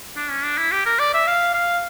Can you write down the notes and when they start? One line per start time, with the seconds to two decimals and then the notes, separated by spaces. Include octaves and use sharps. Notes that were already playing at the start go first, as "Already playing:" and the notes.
0.16 D4
0.30 C#4
0.44 D4
0.58 E4
0.72 G4
0.86 A#4
0.99 D5
1.13 E5
1.27 F5
1.54 F5